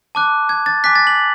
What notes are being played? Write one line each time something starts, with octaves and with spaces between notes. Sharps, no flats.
A5 D6 F#6
G#6
A6
G#5 D6 F#6 B6
A6
F#7